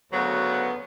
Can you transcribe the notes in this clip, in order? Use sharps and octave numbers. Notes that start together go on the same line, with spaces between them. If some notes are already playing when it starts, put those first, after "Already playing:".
D2 C#3 F#3 B3